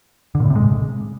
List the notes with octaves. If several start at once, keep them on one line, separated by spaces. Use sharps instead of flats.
D3
A#2
A2
C3
G#3